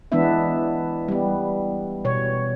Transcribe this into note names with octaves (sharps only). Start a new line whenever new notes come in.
E3 G#3 B3 D4 E4 E5
G3 B3
B2 C#5